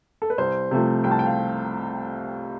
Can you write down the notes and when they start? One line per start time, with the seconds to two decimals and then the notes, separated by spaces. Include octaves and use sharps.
0.22 A4
0.30 B4
0.38 C2 C5
0.71 C3 F3 A3
1.04 C2 G5
1.11 A5
1.19 G5
1.26 F5